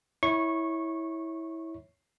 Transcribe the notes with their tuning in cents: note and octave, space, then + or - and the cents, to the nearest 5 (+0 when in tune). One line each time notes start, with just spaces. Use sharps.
E4 -15 C#5 +0 C#6 -20